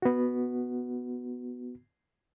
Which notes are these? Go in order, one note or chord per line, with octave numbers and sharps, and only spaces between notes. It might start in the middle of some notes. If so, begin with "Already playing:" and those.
B3 F#4